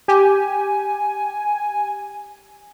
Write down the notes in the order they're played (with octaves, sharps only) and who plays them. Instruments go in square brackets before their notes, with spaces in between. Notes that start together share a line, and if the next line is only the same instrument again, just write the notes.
[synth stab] G4 [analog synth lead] G#5